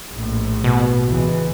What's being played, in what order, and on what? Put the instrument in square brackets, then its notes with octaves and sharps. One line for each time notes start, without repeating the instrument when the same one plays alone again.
[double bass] A#1 A2
[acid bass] B2
[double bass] C#2 E3